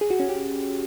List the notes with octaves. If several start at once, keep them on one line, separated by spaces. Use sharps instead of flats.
G#4
F#4
C#4
G4